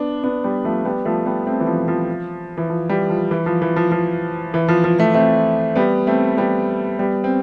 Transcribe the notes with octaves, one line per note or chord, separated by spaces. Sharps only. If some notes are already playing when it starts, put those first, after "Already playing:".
Already playing: B3 D4
B3 D4
G3 B3
F3 A3
G3 B3
F3 A3
G3 B3
A3 C4
E3
F3
F3
E3
F3
E3 G3
F3
E3
F3
E3
F3
F3
E3
F3
F3
F3 A3
A3 C4
G3 B3
A3 C4
G3 B3
G3 B3
C4